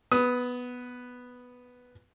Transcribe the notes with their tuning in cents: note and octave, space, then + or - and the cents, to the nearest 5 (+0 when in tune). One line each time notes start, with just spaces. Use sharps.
B3 +0 D#6 +20